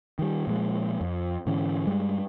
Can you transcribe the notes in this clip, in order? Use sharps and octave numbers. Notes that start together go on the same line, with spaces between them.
D#3 G3
A#2 F3 F#3 G#3
F2
G#2 D3 E3 C#4
G2 G3 G#3